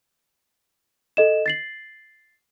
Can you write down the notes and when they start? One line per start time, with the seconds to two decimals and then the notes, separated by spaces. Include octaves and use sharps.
1.17 A4 D#5 E7
1.46 A6 C7 F#7